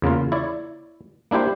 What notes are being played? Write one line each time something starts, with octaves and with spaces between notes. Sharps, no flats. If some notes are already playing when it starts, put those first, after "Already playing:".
E2 C#3 A#3 F4
E4 C#5 D5
A#3 D4 E4 G4 C5